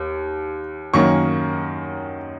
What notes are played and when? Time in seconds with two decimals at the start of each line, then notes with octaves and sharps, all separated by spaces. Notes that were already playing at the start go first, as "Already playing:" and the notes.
Already playing: D#2
0.94 F#2 D#3 A#3 C#4 C#6